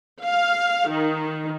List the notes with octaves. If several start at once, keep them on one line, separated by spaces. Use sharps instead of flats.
F5
D#3